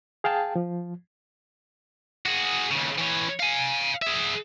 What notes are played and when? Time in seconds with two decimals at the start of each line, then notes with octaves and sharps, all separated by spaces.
0.24 G#4 F5 G5 A5
0.56 F3
2.26 F#4 G#4
2.71 D#2 C#3
2.98 E3 C#5
3.40 F5 G#5
4.02 G#4 E5